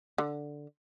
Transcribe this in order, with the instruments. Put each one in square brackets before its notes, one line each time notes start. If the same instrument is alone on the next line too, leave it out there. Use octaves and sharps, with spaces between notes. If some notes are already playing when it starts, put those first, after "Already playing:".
[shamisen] D3